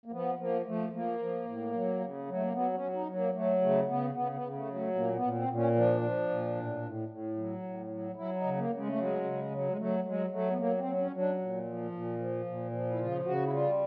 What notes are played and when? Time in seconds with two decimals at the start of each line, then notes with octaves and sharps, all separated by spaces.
0.06 A#3
0.12 F3 B3
0.39 F3 A#3
0.66 F3 A3
0.92 F3 A#3
1.19 F3
1.46 A2
1.73 F#3
2.00 C#3
2.26 F#3
2.32 A3
2.43 A#3
2.53 F#3 B3
2.74 C#4
2.80 F#3
2.93 D#4
3.07 F#3
3.14 A#3
3.34 F#3 A3
3.61 C#3 A3
3.87 C#3 B3
4.14 C#3 B3
4.34 B3
4.41 C#3
4.55 A3
4.67 F#3
4.75 A3
4.95 A#2 A#3
5.15 B3
5.21 A#2
5.35 C4
5.48 A#2
5.55 C#4
5.75 F3 D4
6.01 F3
6.29 A#2
6.55 A2
6.82 A2
7.09 A2
7.37 F#3
7.63 A2
7.89 F#3
8.16 F#3 E4
8.36 D#4
8.43 C#3
8.57 A#3
8.70 C#3
8.76 G#3
8.88 A3
8.96 F#3 G#3
9.24 C#3
9.50 F#3
9.68 G#3
9.77 F#3 A3
10.04 F#3 G#3
10.30 F#3 A3
10.50 B3
10.58 F#3 A#3
10.78 C4
10.84 F#3
10.98 C#4
11.11 F#3
11.17 D4
11.39 A#2
11.65 F3
11.91 A#2
12.18 F3
12.46 A#2
12.72 F3
12.91 E4
12.99 C#3 F4
13.25 C#3 F#4
13.44 E4
13.53 G3 F4